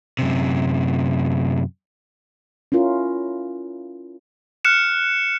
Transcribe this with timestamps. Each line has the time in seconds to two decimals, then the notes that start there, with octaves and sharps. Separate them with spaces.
0.19 F#2 C3
2.72 C#4 E4 F4 A#4
4.65 F6 F#6 C#7 E7